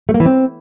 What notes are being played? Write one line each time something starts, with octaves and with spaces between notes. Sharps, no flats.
A3
A#3
E3
C4